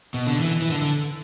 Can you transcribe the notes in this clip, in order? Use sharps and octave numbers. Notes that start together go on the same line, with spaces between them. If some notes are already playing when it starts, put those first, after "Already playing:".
B2
D3
E3
E3
D3
D3